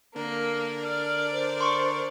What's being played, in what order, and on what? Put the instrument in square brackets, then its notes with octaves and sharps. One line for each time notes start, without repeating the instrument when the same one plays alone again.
[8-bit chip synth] D3 D4 A#4 [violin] A#3
[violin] D5 [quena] F6
[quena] C5
[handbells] C6 C#6